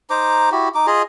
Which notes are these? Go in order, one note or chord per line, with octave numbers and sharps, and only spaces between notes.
D#4 C5 A#5 D6
E4 F#4 G4
D#4 D6
F4 G#4 D#5